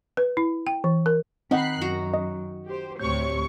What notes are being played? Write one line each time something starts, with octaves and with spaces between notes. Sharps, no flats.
B4
E4
G5
E3
A#4
D#3 C4 D#4 D#5 F#5 B5 F#6 C7
F#2 F#4 A#5
D#5
G4 C5
D2 A2 C3 C#5 C#6 G6